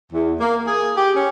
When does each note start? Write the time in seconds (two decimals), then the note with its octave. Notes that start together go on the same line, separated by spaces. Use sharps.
0.12 E2
0.40 A#3
0.67 G#4
0.96 G4
1.15 C#4